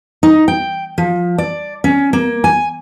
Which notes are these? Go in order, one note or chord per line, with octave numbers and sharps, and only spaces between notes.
D#4
G5
F3
D5
C#4
A#3
G#5